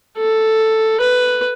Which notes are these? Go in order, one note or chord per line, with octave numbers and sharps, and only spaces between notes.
A4
B4